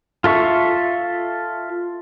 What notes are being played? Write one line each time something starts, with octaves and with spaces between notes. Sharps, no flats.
F4 A4 E5 C#6